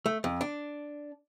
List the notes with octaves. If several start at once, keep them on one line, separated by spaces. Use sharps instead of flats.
A3
F2
D4